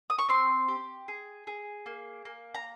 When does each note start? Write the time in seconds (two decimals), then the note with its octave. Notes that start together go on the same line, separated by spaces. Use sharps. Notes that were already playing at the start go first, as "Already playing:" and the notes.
0.10 D#6
0.19 C#6
0.29 C4 C6
0.68 G4
1.08 G#4
1.47 G#4
1.86 A#3
2.25 A#3
2.55 A#5